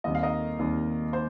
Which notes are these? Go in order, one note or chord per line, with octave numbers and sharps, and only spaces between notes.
D#2 D#3 G3 C4 D#5
F5
A#4 D#5
D#2 D#3 G3 C4
C5